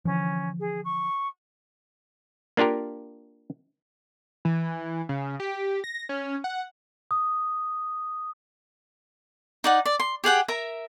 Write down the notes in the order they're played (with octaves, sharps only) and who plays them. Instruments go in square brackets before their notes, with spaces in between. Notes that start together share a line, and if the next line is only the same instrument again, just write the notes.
[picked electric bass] D3 E3 F3 [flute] C#4
[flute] G#4
C#6
[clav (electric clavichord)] A#3 D4 F4 G4 A#4
[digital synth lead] E3
C#3
G4
A#6
C#4
F#5
[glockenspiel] D#6
[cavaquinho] D#4 D5 F#5
D5
C6
G4 G#4 F#5 G5
A#4 E5 A#5